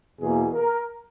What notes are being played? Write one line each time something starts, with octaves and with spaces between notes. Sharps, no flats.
E2 B2 A#3 G#4
A#4